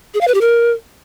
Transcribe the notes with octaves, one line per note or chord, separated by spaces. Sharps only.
G#4
F5
B4
G4
A#4